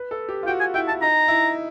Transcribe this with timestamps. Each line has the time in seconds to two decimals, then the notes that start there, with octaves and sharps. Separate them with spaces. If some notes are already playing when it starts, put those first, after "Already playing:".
Already playing: B4
0.11 A4
0.29 G4
0.43 F4
0.47 F#4 G5
0.60 G#5
0.74 E4 G5
0.88 A5
0.91 E4
1.02 D#4 A#5
1.28 E4